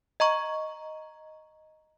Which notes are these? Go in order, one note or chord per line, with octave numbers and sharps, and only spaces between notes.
D#5 A#5 C#6